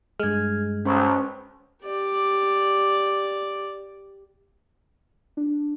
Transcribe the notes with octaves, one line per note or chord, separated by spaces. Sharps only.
G2 G#3 F6 G#6
B1 C#4 C5 C#6
G4 D5
D4